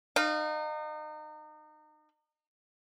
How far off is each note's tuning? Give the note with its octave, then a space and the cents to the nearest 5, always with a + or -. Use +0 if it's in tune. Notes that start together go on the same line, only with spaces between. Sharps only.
D#4 -35 F5 +5